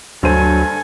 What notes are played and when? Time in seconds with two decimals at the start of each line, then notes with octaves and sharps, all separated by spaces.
0.23 D2 G2 F#3 A4 C5 G#5 D#7